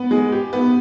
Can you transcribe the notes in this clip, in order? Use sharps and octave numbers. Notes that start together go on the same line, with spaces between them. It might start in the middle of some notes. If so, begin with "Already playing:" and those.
Already playing: B3
G#3
G4
B3